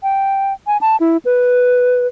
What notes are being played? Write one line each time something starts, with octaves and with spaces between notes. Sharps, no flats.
G5
G#5
A5
E4
B4